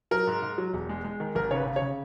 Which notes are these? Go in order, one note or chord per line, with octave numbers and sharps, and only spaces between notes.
F#3 A#4
G#2
G#2
F#3
E1
G#3
G#3
D#3
G#1 A#4
C#3 C#5
B4
C#3
C#5
C#3